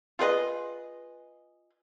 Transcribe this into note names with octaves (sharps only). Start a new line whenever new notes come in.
F4 G#4 B4 D#5